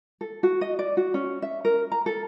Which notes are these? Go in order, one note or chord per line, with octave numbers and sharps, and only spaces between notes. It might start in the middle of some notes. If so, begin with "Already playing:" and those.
A4
F#4
D#5
D5
F#4
C#4
E5
A#4
A#5
A4